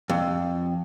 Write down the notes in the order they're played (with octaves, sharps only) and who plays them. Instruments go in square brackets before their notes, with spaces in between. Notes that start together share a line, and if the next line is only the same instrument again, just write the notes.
[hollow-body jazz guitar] F2